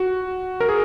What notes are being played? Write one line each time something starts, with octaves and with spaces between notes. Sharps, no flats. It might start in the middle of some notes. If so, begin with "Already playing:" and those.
Already playing: F#4
A#4
G#4